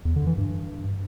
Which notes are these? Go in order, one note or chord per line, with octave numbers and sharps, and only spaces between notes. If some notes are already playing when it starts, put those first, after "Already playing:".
E2
D3
E3
G2